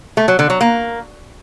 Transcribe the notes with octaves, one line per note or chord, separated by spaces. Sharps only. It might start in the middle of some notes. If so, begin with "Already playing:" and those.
A3
F#3
D3
F#3
A#3